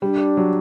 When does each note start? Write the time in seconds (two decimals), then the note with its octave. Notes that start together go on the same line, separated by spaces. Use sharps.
0.02 G3 D4
0.37 F#3